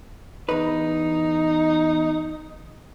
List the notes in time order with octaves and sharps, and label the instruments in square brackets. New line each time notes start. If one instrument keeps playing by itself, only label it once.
[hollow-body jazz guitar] E2 B4 [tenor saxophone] D#4